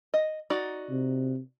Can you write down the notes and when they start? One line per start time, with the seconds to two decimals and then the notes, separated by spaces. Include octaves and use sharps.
0.14 D#5
0.50 D#4 F#4 D5
0.90 C3